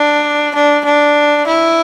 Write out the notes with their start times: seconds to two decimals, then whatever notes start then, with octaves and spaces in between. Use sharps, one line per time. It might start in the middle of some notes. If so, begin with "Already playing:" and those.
Already playing: D4
0.55 D4
0.85 D4
1.47 E4